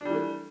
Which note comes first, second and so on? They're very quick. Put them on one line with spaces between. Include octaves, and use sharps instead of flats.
D4 G3 E3 A3